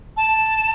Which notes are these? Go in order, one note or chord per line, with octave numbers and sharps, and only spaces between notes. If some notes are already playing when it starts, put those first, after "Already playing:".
A5